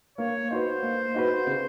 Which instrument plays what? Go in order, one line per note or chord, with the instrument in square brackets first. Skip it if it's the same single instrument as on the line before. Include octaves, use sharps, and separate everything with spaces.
[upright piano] A#3 [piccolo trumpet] C#5
[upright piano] D#4 F#4 B4 [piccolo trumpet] C5
[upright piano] A#3
D#4 F#4 B4
C#3